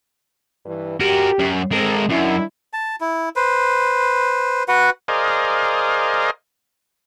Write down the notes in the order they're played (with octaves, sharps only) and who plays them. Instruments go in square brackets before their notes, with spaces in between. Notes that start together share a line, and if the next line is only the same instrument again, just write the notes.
[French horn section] G2 E3
[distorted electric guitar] F#4 A#4 [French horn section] G4
[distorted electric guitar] F#2
[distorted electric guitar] G#3 A#4 [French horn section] C4 A4
[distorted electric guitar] F#2 [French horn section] D#3 D4 E4
[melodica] A5
E4
B4 C5
F#4 B4 F#5
[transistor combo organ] G#4 A#4 C5 D5 D#5 F5